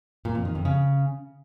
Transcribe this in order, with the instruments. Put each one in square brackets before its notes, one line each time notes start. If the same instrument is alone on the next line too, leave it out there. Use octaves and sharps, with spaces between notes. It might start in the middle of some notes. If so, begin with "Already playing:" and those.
[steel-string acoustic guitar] A#2
F2
D#3
F2
C#3